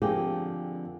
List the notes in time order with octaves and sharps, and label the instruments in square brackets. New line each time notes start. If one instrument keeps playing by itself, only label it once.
[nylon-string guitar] F2 D3 A#3 G4 G#4